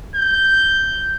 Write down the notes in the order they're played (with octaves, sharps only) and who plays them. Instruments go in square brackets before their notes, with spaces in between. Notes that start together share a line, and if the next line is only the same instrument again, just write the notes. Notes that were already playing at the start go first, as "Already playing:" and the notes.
[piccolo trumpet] G6